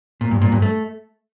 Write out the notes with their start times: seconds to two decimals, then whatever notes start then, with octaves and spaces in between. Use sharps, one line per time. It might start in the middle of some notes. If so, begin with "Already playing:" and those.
0.21 A#2
0.31 G2
0.42 A#2
0.52 G2
0.62 A3